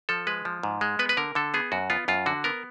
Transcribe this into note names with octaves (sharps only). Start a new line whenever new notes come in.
F3 A4
G#3 B4
F3
G#2
G#3
B3 B4
B4
D3 A#4
D3 A4
B3 G#4
F#2 F#4
B3 F4
F#2 F4
D3 F#4
B3 A#4